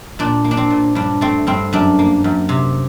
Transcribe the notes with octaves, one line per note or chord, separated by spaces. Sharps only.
A#2 D4
A#3
D4
C4
A#2
G2 D4
A3 C4
G2 C4
F#2 D4
A#3
F#2
C3